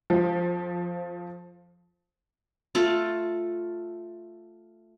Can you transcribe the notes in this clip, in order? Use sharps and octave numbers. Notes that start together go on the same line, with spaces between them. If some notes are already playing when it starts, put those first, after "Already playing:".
F2 F3
A3 F4 A4